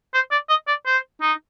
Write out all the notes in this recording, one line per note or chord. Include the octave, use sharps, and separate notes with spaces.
C5
D5
D#5
D5
C5
D#4